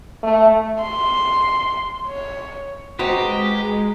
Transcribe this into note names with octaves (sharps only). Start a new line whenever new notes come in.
A3
C6
C#5
G#3 C4 F#4 G4 B4 D#5 A#5